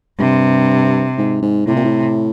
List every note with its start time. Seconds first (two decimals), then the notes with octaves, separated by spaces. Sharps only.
0.19 G2 C3
1.18 G#2
1.42 G#2
1.67 A2 C3
1.76 A#2
1.85 A2